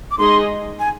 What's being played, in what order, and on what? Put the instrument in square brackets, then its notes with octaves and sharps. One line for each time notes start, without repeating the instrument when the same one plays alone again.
[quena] D6
[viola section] G#3 D#4 G#4 D#5 [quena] C6
[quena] G#5